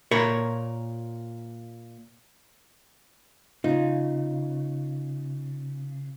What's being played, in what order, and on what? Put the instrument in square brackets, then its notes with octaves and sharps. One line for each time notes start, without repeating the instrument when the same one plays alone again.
[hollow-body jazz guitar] A#2 A#4 C#5 B5
[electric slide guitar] C#3 [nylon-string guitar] D#4 [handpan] F4